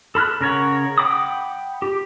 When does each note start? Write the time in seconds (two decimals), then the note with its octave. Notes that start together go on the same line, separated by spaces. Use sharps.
0.15 A4 B5 F6 F#6
0.41 C#3 A#4 C#5 F#5
0.98 F#5 G5 B5 D6 D#6
1.82 G4